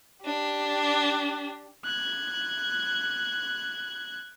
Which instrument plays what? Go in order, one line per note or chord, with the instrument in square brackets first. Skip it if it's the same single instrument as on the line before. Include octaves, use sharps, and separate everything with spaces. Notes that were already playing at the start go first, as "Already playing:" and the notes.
[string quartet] D4 G4
[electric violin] F#6 G#6